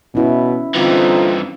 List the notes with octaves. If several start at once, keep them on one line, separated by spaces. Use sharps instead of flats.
B2 C#4 E4
G2 D3 E3 C4 D#4 F4